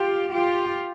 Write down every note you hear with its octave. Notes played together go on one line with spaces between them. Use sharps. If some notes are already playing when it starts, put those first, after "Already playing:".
Already playing: F4 G4
F4 G4